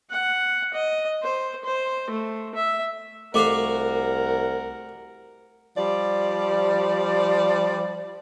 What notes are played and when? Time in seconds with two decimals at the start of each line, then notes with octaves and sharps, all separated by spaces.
0.11 F#5
0.74 D#5
1.23 C5
1.65 C5
2.10 A3
2.55 E5
3.34 C2 A3 F#4 A#4 D#5 F5 F#5 D6
5.78 F3 G3 D5